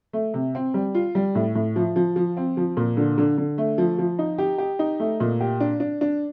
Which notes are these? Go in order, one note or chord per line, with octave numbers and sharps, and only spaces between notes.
A3
C3
C4
G3
F4
G3
A2
A2
F3
F3
F3
C4
F3
A#2
D3
D3
D3
A3
F3
F3
D#4
G4
G4
D#4
A3
A#2
G4
D4
D4
D4